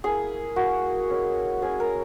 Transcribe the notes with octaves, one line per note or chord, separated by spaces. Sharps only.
A#3 E4 G#4
A#3 E4 F#4
G#3 C#4 E4
G#3 C#4 E4 G#4
A#4